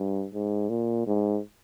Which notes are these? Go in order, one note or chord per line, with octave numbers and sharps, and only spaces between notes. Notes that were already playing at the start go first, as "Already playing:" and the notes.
Already playing: G2
G#2
A#2
G#2